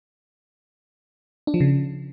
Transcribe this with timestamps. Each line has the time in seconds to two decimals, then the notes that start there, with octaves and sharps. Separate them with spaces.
1.47 D4
1.54 F3
1.60 C#3